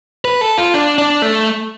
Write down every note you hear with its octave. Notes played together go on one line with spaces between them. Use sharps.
B4
A4
F4
D4
D4
A3